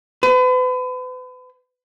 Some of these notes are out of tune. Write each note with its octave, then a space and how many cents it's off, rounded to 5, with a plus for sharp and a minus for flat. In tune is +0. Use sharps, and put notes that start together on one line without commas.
B4 +40